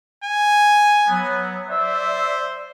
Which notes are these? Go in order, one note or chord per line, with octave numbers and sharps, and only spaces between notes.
G#5
F#3 B3
C5 D5 E5